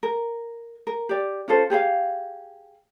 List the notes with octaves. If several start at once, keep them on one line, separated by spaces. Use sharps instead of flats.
A#4
A#4
G4 D5
C#4 F4 A4 C5
G4 G#4 C5 F5